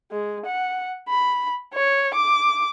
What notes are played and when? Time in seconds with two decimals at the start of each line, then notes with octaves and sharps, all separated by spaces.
0.11 G#3
0.46 F#5
1.09 B5
1.74 C#5
2.14 D6